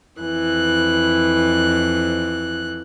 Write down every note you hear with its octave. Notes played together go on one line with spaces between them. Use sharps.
F2 E3 F#6